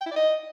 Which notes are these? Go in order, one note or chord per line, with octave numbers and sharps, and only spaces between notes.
G5
E4
D5
D#5